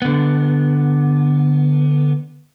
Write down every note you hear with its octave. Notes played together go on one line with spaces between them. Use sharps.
D3 B3